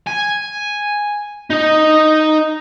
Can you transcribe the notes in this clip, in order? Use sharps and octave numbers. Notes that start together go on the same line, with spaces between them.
G#5
D#4 D#5